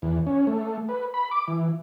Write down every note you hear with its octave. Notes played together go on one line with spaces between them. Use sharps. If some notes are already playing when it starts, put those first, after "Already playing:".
E2
C#4
A3
B4
B5
D6
E3